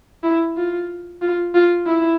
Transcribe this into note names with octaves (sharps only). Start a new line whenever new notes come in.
E4
F4
F4
F4
E4